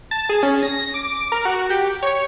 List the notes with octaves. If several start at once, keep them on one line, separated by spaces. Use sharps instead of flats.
A5
G#4
C#4
A#6
D6
A#4
F#4
G4
C#5